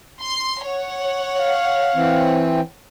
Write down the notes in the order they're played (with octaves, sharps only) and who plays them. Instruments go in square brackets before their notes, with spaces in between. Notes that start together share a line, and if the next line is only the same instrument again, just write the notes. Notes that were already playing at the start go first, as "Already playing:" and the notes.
[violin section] C6
C#5 F#5
[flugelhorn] F5
[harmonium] E3 C4